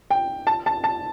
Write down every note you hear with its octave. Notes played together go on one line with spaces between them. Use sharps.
G5
A5
A5
A5